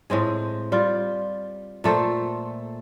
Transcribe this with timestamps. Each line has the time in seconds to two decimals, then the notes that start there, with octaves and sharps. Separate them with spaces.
0.10 A2 G#3 C4 G#4
0.72 G3 F4
1.84 A#2 A3 A4 C5